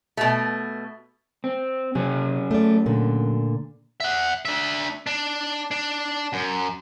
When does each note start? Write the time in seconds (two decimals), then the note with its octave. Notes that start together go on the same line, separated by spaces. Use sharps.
0.17 B2 A3
1.44 C4
1.95 C3 F#3 C#4 G#4
2.51 A3 D5
2.86 A#2 D3
4.00 E5 F#5
4.45 D4 E5
5.07 D4
5.71 D4
6.33 F#2